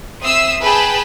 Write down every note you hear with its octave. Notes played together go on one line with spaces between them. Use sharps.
C4 E5 D#6 E6 C7
G#4 B4 G5 A5 B5